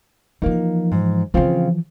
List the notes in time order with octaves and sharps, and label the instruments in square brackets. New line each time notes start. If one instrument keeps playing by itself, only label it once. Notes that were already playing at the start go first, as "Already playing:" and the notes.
[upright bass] E3 F3 [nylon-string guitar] A#3 D#4
[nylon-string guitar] G#2
[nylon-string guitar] C#3 C4 F4 [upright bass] E3 F3